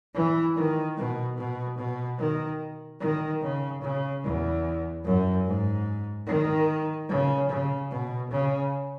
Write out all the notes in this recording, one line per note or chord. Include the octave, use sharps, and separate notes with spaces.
E3
D#3
B2
B2
B2
D#3
D#3
C#3
C#3
E2
F#2
G#2
D#3
C#3
C#3
B2
C#3